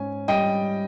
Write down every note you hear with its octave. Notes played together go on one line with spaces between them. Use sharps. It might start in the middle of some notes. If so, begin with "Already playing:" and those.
Already playing: G#2 C#4 G#5
G3 D#5 G5